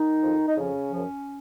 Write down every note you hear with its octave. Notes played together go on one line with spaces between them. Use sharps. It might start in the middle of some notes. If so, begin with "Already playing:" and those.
Already playing: D#3 D#4
F2 F3
D#4
F2 C#3 F3 C#4
F#2 C#3 F3